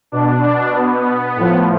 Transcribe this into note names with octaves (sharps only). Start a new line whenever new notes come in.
B2 D4
D4
B3
A2 F3